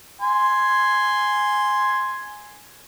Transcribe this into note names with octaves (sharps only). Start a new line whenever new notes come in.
G#5 C6